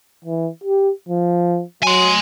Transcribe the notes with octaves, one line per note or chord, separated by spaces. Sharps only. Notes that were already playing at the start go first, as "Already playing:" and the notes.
E3
G4
F3
F#3 G#5 C6